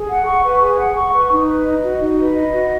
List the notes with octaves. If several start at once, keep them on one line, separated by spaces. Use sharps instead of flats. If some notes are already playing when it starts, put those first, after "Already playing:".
Already playing: G#4
F#5
C#6
B4
G#4
F#5
C#6
B4
D#4
B4
D#5
F#4
D#4
B4
D#5
F#4